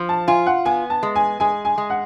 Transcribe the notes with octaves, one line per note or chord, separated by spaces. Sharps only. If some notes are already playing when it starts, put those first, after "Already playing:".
Already playing: F3
A5
F4 G#5
F#5
B3 G#5
A5
G#3
G#5
G#3 G#5
G#5
G#3
F#5